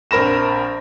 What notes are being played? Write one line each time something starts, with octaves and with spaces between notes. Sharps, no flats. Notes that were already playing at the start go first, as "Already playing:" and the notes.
A#1 C4 A#4 B5 A#6 E7